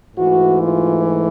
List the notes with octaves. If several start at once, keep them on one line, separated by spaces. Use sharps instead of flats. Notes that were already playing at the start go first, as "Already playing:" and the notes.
G#2 E3 A3 F#4
F4